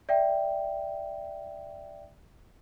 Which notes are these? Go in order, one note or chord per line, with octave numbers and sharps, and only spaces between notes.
D5 E5 G5